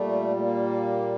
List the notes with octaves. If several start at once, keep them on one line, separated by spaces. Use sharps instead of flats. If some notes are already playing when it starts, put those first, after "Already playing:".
Already playing: A#2 G3 A3
A3
A#3